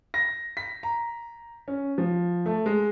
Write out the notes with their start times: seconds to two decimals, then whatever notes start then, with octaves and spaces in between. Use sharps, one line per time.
0.14 A#6
0.57 B6
0.83 A#5
1.68 C#4
1.98 F3
2.46 A3
2.66 G#3